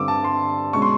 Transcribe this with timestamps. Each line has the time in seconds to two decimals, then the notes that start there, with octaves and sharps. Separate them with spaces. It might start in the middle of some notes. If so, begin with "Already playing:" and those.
Already playing: G2 D3 G3 C4 D6 E6
0.08 A5
0.24 C6
0.73 B2 G#3 C#4 C#6
0.82 C6